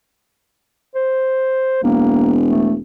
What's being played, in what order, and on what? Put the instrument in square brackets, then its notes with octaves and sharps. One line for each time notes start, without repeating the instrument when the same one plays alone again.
[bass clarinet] C5
[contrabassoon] E1 [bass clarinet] A#3
[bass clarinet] A3